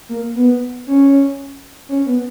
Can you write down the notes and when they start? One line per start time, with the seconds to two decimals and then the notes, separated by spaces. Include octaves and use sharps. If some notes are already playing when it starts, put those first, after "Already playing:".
0.09 A#3
0.35 B3
0.87 C#4
1.89 C#4
2.06 B3